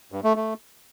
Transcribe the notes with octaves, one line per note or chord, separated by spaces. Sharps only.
G2
A3
A3